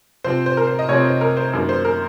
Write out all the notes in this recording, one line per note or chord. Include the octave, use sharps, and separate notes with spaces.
C3 F3 C4 C5
C5
A#4
C5
D#5
C3 F3 C4 C#5
C5
A#4
C5
F#2 D#3 A#3
C5
A#4